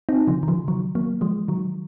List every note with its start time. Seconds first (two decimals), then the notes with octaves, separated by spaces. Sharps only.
0.09 C4 D#4
0.28 C#3 F3
0.43 D#3
0.48 C#3 F3
0.68 D#3 F#3
0.95 F#3 A#3
1.21 F3 G#3
1.48 D#3 F#3